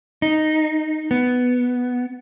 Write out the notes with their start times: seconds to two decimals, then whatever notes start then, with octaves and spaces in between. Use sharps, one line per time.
0.22 D#4
1.11 B3